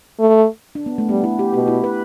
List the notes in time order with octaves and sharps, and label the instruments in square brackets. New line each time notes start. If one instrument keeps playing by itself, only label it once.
[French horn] A3
[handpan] D4
B3
A3
[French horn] G3 [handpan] B3
[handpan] E4
G4
[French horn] B2 [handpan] G4
[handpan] E4
B4